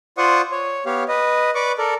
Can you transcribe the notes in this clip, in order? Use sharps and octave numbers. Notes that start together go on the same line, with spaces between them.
F4 C5 D5 F#5 C#6 D#6
C#5
B3 G4 C#5 F5
B4 D#5
B4 D5 C#6 D6
A4 A#4 D5